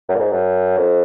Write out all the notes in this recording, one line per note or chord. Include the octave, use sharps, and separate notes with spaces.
F#2
A#2
G#2
F#2
F2